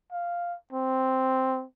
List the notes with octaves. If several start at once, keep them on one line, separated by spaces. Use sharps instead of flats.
F5
C4